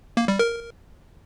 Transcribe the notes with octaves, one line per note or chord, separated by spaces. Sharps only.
A#3
G3
A#4